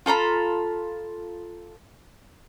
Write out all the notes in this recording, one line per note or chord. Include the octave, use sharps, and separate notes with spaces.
F4 A4 A#5 B5